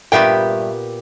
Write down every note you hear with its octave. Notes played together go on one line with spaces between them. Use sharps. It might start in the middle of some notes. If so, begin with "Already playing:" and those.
G2 A#2 B3 G4 E5 G5